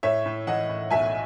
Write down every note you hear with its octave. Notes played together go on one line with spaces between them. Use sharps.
A2 C#5 E5
A2
E3 D#5 F#5
A2
B1 E5 G#5